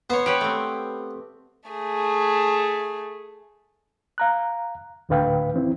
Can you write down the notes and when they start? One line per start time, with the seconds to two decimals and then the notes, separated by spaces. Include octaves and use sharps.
0.10 B3 C5 C#5
0.26 G4 B4 C#5
0.41 A3 C4
1.69 A3 G#4
4.18 F5 A#5 F#6
5.09 D2 A2 D3 B4 F5 G5
5.54 E3 C4 E4